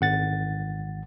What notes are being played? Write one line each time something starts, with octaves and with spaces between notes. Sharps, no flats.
G#1 F#5 A6